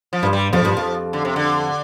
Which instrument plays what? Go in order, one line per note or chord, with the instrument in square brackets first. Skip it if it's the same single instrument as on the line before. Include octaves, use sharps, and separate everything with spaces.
[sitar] F3
[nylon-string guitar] G2
[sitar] G3
[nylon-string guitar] F2 [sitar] F3
[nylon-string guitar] G2
F2
[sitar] D3
C3
D3